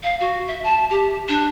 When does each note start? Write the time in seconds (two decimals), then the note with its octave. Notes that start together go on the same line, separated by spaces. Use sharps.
0.03 F5
0.20 F#4
0.48 E5
0.64 A5
0.90 G4
1.28 D4